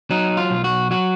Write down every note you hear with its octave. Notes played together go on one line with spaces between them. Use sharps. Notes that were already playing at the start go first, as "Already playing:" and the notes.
F#3 D#4
F4
B1
F#4
F#3 F#4